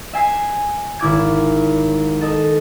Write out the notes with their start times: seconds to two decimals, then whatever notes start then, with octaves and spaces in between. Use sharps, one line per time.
0.13 E5 G#5 C7
0.99 G#1 E4 D6 G#6
2.21 A4 D#5